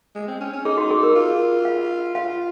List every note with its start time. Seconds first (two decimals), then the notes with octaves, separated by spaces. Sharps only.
0.15 G#3
0.28 C4
0.40 C#4
0.53 C#4
0.65 D#4 G#4
0.78 F#4
0.90 G#4
1.03 A#4
1.15 F4
1.65 F5
2.15 F4 F5